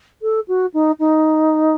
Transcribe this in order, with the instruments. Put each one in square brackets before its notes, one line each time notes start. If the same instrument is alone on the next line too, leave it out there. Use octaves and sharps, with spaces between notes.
[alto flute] A4
F#4
D#4
D#4